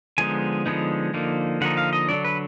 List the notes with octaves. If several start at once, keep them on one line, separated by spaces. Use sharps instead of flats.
D3 F3 G#3 B3 D#4 G#5
D3 F3 G#3 B3 D#4
D3 F3 A#3 D#4
D3 F3 A#3 D#4 F#5
F5
D#5
D3 F#3 D4 D5
B4